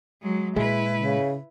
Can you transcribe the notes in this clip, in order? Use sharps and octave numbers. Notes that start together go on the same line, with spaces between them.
F#3 G#3
A#2 G#3 E4 B4
C#3